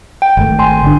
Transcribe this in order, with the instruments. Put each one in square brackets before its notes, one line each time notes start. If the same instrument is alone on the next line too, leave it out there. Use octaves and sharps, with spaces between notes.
[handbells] G5
[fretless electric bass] G#1 A3
[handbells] G5 G#5 C6
[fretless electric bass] D3 D4